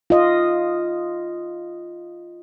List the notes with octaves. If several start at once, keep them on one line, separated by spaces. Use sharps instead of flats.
F4 D#5